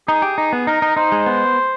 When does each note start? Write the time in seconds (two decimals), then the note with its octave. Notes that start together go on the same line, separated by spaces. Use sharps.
0.08 D#4 G#4
0.22 G4
0.38 D#4
0.53 B3
0.67 D#4 A#4
0.82 D#4
0.96 D#4 C5
1.12 G#3
1.27 B3